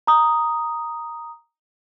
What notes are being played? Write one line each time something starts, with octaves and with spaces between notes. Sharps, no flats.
A#5 D#6